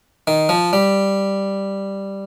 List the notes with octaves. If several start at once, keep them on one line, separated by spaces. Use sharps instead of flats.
D#3
F3
G3